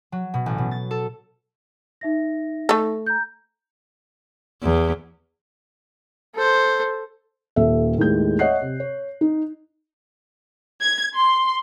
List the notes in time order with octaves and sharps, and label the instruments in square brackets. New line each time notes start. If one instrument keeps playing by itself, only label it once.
[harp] F#3
B2
A1
B2
A6
A4
[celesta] D#4 E5 A#6
[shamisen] A3 A4
[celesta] A#5 G6
[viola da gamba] E2
[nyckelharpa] A4 C5
[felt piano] D#1 A4 E5
D#2 A2 G#3 G6
C#5 D#5 E5 F#5 F#6 C7
C3
C#5
D#4
[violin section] G#6
C6